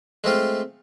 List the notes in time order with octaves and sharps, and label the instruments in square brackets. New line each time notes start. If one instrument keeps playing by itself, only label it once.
[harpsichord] G#3 A3 C4 F4